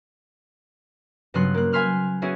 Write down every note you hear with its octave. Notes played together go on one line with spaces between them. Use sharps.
G2 C#3 F#3 B3 C6 F#6
A#3 F#6
F5 G#5 B5 C6 F6 F#6
B3 C#4 E4 F#4 G#4